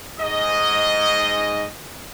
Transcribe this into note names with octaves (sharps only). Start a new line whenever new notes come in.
G#2 D#5